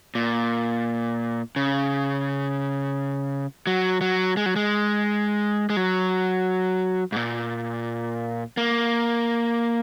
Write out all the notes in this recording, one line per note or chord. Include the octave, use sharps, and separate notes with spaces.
A#2
C#3
F#3
F#3
G#3
F#3
G#3
G#3
F#3
G#2
A#2
A#3